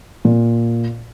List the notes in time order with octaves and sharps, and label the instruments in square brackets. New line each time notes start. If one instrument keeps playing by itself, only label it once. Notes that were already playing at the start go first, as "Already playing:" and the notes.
[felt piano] A#2